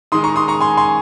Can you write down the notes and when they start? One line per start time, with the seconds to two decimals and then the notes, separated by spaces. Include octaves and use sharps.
0.12 D#3 G#3 C6 D#6
0.24 A#5 C#6
0.36 C6 D#6
0.48 A#5 C#6
0.60 G#5 C6
0.77 G#5 C6